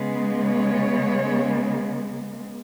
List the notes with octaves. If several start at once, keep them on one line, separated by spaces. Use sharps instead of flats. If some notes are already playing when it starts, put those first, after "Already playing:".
Already playing: C#3 G#3 B3
C#5